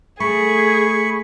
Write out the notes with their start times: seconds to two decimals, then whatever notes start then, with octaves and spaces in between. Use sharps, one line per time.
0.20 A3 G#4 B5 C#6